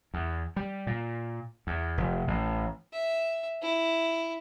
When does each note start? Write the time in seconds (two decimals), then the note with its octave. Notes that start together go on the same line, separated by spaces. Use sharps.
0.14 E2
0.56 G3
0.87 A#2
1.67 E2
1.98 F1
2.28 A1
2.92 E5
3.62 E4